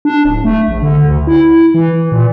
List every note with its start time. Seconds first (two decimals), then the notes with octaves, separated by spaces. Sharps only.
0.05 D4
0.25 D1
0.45 A3
0.68 A#1
0.83 D3
1.04 D2
1.27 E4
1.74 E3
2.12 A#2